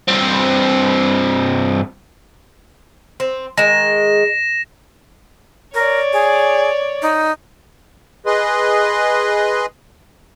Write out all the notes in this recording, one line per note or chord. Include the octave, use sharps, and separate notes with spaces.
G2 C4
C4
D#3 G#3 A#6 E7
A#4 C#5 D5
G#4
D#4
G#4 B4 D#5 C6